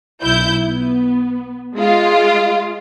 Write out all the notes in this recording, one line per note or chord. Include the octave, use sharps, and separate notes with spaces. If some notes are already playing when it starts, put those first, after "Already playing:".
B1 E4 G6
B3
G#3 F4